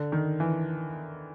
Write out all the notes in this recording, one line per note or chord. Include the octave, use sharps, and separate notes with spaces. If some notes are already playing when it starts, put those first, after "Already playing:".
Already playing: D3
D#3
E3